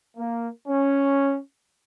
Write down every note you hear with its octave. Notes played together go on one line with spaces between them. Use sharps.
A#3
C#4